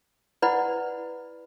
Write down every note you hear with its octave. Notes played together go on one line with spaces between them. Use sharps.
E4 B4 D5 F#5 B5